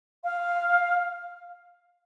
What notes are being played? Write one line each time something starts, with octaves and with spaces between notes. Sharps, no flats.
F5